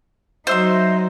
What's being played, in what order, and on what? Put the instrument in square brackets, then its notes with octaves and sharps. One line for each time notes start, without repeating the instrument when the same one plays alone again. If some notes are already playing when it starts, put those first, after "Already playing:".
[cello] F#3 D#4 [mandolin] C5 E5 C6